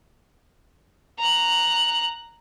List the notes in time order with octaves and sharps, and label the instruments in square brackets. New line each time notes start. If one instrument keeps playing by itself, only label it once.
[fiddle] A#5 F#6